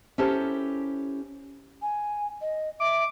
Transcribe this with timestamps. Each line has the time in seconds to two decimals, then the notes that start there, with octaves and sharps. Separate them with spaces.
0.18 C#4 E4 G4 A4 A#4 C5
1.82 G#5
2.41 D#5
2.80 E5 D6